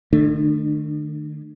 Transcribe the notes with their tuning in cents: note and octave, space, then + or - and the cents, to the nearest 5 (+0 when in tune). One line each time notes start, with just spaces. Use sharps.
D#3 -45 A3 +0 D4 +30